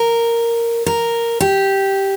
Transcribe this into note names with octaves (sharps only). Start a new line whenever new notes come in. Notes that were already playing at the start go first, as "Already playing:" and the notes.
Already playing: A#4
A#4
G4